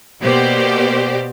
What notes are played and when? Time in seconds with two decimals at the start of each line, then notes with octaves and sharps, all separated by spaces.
0.22 B2 A#3 G4 C5 D5